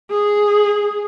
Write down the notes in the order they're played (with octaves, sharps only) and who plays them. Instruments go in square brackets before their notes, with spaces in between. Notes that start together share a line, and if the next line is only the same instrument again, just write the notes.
[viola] G#4